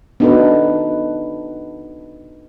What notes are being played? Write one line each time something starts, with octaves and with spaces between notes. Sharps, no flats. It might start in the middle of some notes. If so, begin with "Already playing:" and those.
B3 D4 D#4 F#4 A4 B4